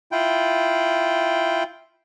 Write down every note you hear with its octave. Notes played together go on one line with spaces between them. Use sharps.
E4 F4 G5